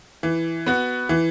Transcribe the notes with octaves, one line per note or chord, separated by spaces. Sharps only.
E3
B3 F#4
E3